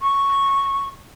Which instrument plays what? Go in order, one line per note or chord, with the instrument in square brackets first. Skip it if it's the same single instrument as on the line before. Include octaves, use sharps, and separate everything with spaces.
[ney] C#6